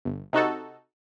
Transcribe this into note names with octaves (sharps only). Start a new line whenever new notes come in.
G1
C3 D#4 F#4 A4